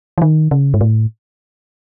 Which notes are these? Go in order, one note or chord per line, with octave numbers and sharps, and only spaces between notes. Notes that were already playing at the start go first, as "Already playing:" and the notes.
E3
D#3
C#3
G#2
A2